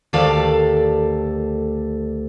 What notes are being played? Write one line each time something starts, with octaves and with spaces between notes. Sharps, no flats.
D2 D#3 G4 A4 D5 F5